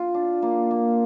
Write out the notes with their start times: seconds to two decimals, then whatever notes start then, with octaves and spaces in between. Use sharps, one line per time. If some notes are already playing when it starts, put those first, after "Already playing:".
Already playing: F4
0.14 D4
0.42 A#3
0.71 A#3